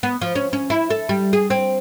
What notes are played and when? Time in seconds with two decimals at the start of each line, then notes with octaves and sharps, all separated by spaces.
0.03 B3
0.21 F3
0.35 C#4
0.53 C#4
0.70 E4
0.90 A4
1.09 G3
1.33 G#4
1.50 C4